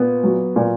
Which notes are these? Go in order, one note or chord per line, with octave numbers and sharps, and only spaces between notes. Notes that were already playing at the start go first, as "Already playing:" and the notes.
Already playing: A#2 B3
F#3
A#2